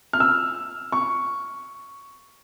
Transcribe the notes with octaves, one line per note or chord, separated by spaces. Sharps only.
F6
E6
C#6